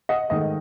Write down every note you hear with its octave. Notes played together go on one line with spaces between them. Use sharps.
D#5 F#5
G#2 D#3 A3 D#5